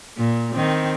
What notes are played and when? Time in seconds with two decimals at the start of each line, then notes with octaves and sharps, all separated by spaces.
0.18 A#2
0.53 D#3 C4